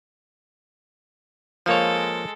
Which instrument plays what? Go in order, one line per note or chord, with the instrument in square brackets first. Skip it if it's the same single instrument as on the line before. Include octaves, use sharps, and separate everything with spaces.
[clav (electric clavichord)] F3 A#3 C#5 [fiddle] G#3 A4